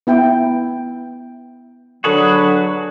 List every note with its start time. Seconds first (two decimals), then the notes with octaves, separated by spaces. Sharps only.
0.07 B3 E4 G5
2.04 D3 F#3 D4 F#4 G#4 B4